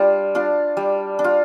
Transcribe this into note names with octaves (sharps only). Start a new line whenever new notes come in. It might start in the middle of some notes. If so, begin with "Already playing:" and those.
Already playing: G3 D4 F4
D4 F4
G3
D4
F4